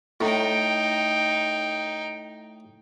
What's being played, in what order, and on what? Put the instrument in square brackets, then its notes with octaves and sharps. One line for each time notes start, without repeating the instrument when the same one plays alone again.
[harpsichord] A2 [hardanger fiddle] D#4 G5